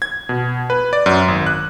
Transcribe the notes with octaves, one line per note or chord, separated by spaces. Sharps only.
G#6
B2
B4
D5
F#2
G#1
F#6